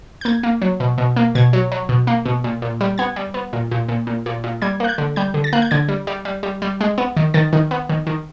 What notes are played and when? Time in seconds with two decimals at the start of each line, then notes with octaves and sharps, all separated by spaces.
0.21 G6
0.25 A#3 G#6
0.43 A#3
0.62 F#3
0.80 B2
0.98 B2
1.16 A#3
1.35 B2 G#6
1.53 F#3
1.72 F#3
1.89 B2
2.07 A#3
2.25 B2
2.44 A#2
2.62 A#2
2.81 G3
2.98 B3 G#6
3.16 G3
3.34 B3
3.53 A#2
3.71 A#2
3.89 A#2
4.07 A#2
4.26 A#2
4.44 A#2
4.62 G3 G#6
4.80 A#3 F#6
4.89 G6
4.98 D3
5.16 G3 G6
5.34 D3
5.44 A6
5.53 A#3 F#6
5.62 G6
5.71 D3 G#6
5.89 G3
6.07 G3
6.25 G3
6.43 G3
6.62 G3
6.81 G#3
6.98 B3
7.17 D#3
7.34 D#3 A6
7.53 D#3
7.71 B3
7.89 D#3
8.07 D#3